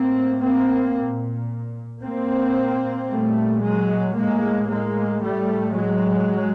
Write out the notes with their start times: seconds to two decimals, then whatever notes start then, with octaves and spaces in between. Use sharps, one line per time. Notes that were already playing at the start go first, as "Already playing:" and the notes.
Already playing: A2 A#3 C4
0.42 A#3 C4
0.96 A#2
2.02 A#2 A#3 C4
3.09 A#2 G3 A3
3.62 F#3 G#3
4.15 A2 G#3 A#3
4.69 G#3 A#3
5.22 A2 G3 A3
5.76 F#3 G#3